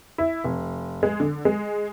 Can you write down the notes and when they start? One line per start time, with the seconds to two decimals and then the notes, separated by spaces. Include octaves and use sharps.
0.18 E4
0.45 F1
1.03 G#3
1.20 D3
1.45 G#3